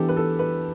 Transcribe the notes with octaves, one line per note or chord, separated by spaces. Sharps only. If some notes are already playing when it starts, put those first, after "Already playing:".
Already playing: E3 B3 D4 G4 A4
B4
A4
B4